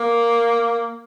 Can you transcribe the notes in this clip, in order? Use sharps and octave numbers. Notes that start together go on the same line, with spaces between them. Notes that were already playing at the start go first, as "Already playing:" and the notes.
Already playing: A#3